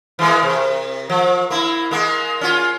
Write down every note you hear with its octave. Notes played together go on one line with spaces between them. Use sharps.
E3 G#3 A#3
C3
F3
A#3 E4
G#3 A#3
C#4 F4